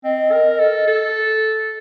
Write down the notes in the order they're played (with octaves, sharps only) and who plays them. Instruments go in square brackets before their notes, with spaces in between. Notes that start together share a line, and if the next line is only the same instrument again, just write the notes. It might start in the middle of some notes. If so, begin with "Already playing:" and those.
[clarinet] C4 [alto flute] D#5
[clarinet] A#4
A4
A4